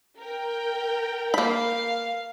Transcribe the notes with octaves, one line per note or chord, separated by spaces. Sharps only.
A#4 G5
A#3 F5 B5